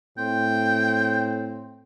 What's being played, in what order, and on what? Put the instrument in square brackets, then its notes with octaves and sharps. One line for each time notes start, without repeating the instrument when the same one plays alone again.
[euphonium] A2 [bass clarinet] C4 [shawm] G5